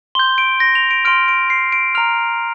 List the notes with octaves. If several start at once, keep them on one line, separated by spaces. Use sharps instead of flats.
C6 G6 G7
D7
A#6
F7
D7
C6 F6 D7
D7
C7
D7
A#5 F6 F7